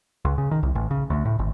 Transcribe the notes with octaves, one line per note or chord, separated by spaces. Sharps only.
C#2
C#3
D#3
C2
A1
C#3
D2
A2
G#1